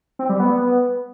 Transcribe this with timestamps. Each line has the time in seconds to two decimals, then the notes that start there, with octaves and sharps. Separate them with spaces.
0.19 C4
0.29 G3
0.40 B3